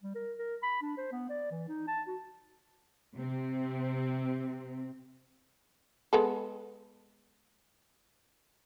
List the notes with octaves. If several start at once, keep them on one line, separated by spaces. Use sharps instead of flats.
G3
A#4
A#4
B5
D4
C5
B3
D5
E3
D#4
A5
F#4
C3 C4
G#3 B3 A4